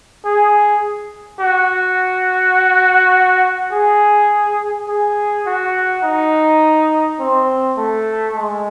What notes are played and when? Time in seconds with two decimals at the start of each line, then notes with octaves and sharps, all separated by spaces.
0.25 G#4
1.40 F#4
3.73 G#4
4.88 G#4
5.46 F#4
6.04 D#4
7.20 C4
7.77 A3
8.36 G#3